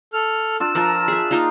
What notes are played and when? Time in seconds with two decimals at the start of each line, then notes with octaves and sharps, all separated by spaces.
0.13 A4 F6
0.60 D4 F4 E6
0.75 F3 A#4 A5 A#5
1.08 G#4 E5
1.31 A#3 D#4 F4